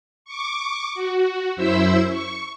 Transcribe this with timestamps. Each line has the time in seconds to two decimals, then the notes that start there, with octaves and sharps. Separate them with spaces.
0.25 C#6 D6
0.95 F#4
1.56 F#2 E4 C5 E5 E6
2.09 C#6